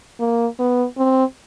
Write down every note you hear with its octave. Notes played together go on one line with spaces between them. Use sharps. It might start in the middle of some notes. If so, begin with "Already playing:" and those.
A#3
B3
C4